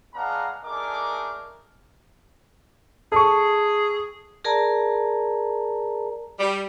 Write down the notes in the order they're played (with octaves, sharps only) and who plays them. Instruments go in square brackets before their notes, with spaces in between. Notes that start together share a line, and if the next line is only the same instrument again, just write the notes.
[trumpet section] G#3 B3 D4 F5 F#5 A#5
A3 D4 D#4 G#4 A#4 D6
[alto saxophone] G#4 [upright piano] A4 C#6
[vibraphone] G#4 A#4 D5 A5 A#5
[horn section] G3